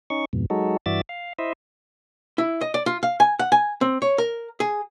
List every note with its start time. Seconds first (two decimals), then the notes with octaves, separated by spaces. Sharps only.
0.10 C#4 D#4 C#6
0.33 F2 G#2 B2
0.50 F#3 G#3 D#4 F#4 A4
0.86 G2 E3 F#4 D5 E5 A6
1.09 F5
1.39 E4 C5 D#5 E5
2.38 E4
2.61 D#5
2.74 D5
2.86 F4
3.03 F5
3.20 G#5
3.39 F#5
3.52 G#5
3.81 C4
4.02 C#5
4.18 A#4
4.60 G#4